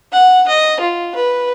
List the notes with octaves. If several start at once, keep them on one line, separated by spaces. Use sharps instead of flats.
F#5
D#5
F4
B4